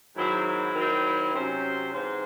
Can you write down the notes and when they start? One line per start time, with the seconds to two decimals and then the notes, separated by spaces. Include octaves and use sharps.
0.16 G#2 D#3 F#3 C4 E4
0.46 E4
0.75 D#3 F#3 C4
1.05 E4
1.34 C3 F#3 C#4 C5
1.93 G#2 E3 C4 C5